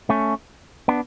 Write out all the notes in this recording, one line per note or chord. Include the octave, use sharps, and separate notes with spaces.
A3 C#4
B3 D4